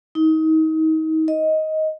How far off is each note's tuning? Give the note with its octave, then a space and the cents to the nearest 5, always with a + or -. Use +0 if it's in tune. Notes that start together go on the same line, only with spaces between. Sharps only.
D#4 +30
D#5 +10